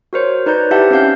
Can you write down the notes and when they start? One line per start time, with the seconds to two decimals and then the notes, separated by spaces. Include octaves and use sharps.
0.13 F#4 A#4 C5 C#5
0.46 D#4 B4 D5 A#5 G6
0.71 E4 G4 E5 F#5 A5 G6
0.90 C4 C#4 F5 G6